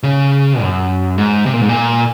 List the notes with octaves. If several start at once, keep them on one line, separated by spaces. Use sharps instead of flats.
C#3
F#2
G#2
C3
A#2
G#2
A#2